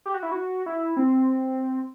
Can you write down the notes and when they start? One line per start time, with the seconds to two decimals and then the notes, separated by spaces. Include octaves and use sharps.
0.06 G4
0.14 F#4
0.23 E4
0.32 F#4
0.66 E4
0.97 C4